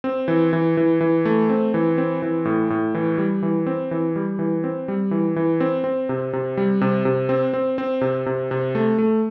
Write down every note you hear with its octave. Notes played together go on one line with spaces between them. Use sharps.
C4
E3
E3
E3
E3
A3
C4
E3
C4
E3
A2
A2
E3
G3
E3
C4
E3
G3
E3
C4
G3
E3
E3
C4
C4
C3
C3
G3
C3
C3
C4
C4
C4
C3
C3
C3
A3
A3